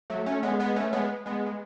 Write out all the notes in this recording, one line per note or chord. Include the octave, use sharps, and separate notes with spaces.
F#3 A3
A3 C#4
G#3 B3
G#3 B3
A3 C#4
G#3 B3
G#3 B3
G#3